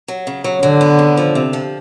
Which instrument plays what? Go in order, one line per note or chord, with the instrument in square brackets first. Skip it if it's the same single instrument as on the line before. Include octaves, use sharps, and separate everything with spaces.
[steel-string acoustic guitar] F#3
C#3
F#3
[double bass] D3 [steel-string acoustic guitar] F#3
[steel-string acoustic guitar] B3
C#3
F3
C3
F3